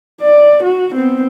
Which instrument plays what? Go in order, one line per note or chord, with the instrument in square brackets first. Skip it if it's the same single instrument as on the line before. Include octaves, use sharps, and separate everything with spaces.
[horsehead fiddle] D5
F#4
B3 C4